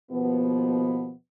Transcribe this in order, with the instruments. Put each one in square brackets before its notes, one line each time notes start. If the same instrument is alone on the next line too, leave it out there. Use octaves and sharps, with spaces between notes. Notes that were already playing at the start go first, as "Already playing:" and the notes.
[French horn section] D#2 B2 F3 B3